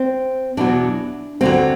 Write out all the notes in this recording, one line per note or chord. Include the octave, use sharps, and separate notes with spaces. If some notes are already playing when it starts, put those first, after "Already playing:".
Already playing: C4
E2 B2 F#3 D4
D2 D3 F#3 C4